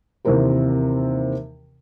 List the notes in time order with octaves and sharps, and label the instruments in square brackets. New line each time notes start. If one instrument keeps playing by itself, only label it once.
[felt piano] D#2 C3 E3 C4 A#4 C5